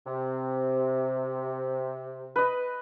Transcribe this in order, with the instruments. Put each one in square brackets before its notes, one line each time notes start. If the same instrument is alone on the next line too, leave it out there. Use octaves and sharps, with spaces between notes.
[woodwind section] C3
[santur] B4 D#5